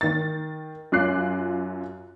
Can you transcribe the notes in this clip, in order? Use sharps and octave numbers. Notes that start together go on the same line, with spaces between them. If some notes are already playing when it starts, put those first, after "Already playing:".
D#3 A6
F#2 F4 D6 F#6 C7